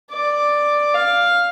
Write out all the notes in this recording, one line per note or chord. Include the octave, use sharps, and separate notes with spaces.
D5
F5